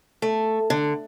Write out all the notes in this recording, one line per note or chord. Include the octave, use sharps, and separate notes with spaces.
A3
D3